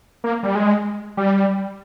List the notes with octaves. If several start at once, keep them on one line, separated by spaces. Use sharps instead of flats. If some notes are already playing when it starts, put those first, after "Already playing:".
A#3
G3
G#3
G3